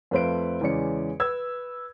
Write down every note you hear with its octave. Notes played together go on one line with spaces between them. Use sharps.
F2 A3 B4 C5 F5 D7
E2 C#3 G#3 C#4 D5 C#7
B4 E6 G#6